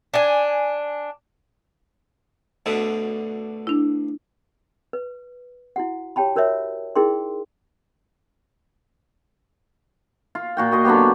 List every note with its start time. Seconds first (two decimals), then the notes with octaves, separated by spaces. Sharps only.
0.14 D4 G#5
2.66 D2 B2 D3
3.67 D4 E4
4.93 B4
5.76 E4 F#4 F#5
6.16 G4 C#5 G5 A5 B5
6.36 F#4 A#4 C5 C#5 E5
6.96 D#4 E4 G#4 A#4 G5 C6
10.35 F4
10.57 A#2 F#4 G5
10.72 F#4 D#5 C6
10.85 D3 F#3 B3 G4